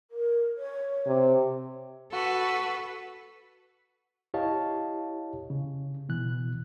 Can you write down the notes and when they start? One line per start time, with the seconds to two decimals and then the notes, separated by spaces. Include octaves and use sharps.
0.11 A#4
0.58 C#5
1.07 C3
2.12 F#4 A4 B4
4.34 E4 G4 C#5 D#5 F5 A5
5.50 C#3
6.09 B2 E3 F#6